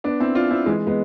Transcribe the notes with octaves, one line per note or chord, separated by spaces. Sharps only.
B3 D4
C4 E4
D4 F4
C4 E4
E3 G#3
G#3 B3